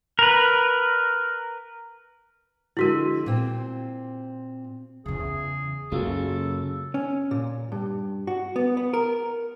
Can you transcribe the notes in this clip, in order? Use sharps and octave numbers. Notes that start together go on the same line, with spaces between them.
A#4 B4
D3 F3 G#3 E4 F#4 A#4
A#2 C4
E2 C#3 G#4
F#2 C#3 F#3 G#3 A#3 F4 F#4 A4
C#4
A#2
G2
F#4
B3
B3
A#4